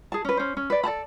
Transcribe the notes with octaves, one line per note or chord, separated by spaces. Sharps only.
G#4 A5
C#4 B4
C#4 C5
C#4
B4 D5
A4 D5 A5 B5